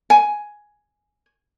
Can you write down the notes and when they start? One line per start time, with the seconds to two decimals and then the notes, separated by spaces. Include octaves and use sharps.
0.10 G#5